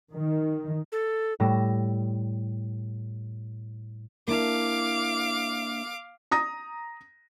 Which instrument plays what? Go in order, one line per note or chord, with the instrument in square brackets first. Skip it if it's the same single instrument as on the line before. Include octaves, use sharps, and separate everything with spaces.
[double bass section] D#3
[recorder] A4
[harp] A2 G3 E6 A#6
[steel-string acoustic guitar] A#3 D4 E4 [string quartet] F5 D6
[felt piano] A#5 D#6 A#6